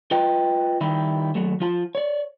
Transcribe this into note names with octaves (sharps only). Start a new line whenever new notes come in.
F4 B4 D#5 G5
D#3 G3 E4 G4
D#2 F#3 A3
F3 F4 A5
C#5 D5